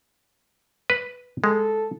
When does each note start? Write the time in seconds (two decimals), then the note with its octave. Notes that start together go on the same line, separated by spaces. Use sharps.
0.90 B4
1.44 G#3 A4